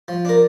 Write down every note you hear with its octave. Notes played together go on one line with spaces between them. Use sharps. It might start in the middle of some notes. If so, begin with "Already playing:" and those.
F3
D4 A#4